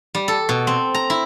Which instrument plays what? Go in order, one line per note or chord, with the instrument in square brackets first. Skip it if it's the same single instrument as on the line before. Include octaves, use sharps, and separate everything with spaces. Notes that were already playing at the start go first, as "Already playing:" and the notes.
[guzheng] G3
A4
B2
C4
A#5
E4